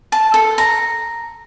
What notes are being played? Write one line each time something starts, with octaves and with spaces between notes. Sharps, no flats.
A5
A4
A#5